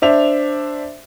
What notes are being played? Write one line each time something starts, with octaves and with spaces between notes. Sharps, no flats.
D4 C5 E5 F7